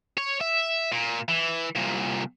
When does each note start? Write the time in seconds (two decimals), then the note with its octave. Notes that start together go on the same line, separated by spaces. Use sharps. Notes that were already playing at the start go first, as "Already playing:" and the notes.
0.18 C#5
0.41 E5
0.92 A#2
1.28 E3
1.76 C2 A#2